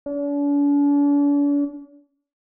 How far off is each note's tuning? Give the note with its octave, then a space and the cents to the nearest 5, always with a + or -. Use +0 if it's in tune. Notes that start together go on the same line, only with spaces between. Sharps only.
D4 -45